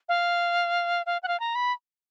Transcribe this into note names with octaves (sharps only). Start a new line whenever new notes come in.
F5
F5
F#5
F5
A#5
B5